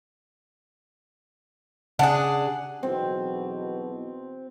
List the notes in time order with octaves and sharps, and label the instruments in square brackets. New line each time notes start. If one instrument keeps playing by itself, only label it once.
[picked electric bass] C#3 [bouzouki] D4 G#4 [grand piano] F#5
[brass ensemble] B1 E2 B2 [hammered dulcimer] C4